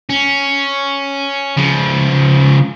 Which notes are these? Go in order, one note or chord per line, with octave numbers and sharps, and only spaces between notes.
C#4
C#3 F3